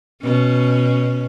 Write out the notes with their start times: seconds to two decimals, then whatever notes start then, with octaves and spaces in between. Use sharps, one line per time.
0.23 B2 C#4